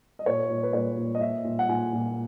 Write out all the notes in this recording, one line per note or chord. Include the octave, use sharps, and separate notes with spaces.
D#5
A#2 C#5
A#2
B4
A#2 C#5
A#2
D#5
A#2 E5
A#2
F#5
A#2 G#5
A#2